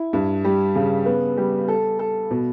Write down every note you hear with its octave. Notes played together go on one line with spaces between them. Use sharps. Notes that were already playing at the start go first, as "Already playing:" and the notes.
Already playing: E4
G2
G3
C#3
B3
G3
A4
A4
B2